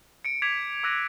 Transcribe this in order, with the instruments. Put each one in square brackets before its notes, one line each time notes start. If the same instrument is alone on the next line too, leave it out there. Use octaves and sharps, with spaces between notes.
[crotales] C#7 D7
D6 G#6 B6 E7 F7
D6 E6 F#6 A#6 C#7 D#7